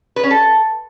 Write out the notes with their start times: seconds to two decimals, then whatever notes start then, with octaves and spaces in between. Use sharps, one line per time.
0.16 B4
0.23 C#4
0.31 A4